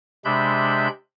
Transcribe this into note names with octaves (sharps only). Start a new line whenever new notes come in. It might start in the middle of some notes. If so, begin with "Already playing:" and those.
C3 G#3 D4 E5 B5 G6